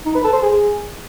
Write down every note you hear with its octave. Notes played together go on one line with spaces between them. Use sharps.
D#4
B4
A4
C5
G#4